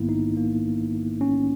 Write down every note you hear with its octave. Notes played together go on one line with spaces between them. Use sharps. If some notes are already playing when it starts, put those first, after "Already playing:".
Already playing: A#1 G#2 D#3 A#3 B3 E4
D#4
A#3
C#4